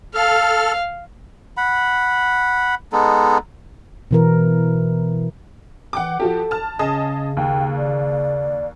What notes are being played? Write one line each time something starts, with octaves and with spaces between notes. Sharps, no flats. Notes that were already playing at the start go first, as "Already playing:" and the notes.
A4 F5 F6
F#5 B5
G#3 B3 D#4 A4
B2 E3 A#4
E3 F#5 G5 D6
F3 F#4 G4 A4
A5 F6
C#3 C#4 G#4 D#5 A5
D#2 G5
D5